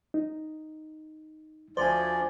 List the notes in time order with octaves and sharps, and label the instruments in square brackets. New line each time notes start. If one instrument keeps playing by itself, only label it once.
[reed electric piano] D#4
[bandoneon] D2 F3 D5 [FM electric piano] C5 G#5